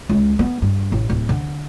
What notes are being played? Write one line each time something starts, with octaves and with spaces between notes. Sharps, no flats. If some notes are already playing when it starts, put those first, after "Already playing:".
C#2
B3
G2
A1
D1
D3